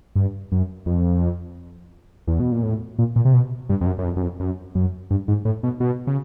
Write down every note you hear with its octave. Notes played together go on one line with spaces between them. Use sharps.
G2
F#2
F2
E2
B2
A#2
A2
A#2
A#2
C3
B2
G2
F2
F#2
F#2
F2
F#2
F2
F#2
F#2
G2
G#2
A2
B2
B2
C#3